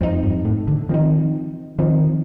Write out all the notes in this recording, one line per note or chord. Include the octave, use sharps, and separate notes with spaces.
F2 F3 C4 D#4
G2
A2
D3
D#3 F3 C4 D#4
D#3 F3 C4 D#4